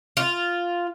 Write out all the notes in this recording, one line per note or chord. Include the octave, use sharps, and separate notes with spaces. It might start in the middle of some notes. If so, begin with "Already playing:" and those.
F4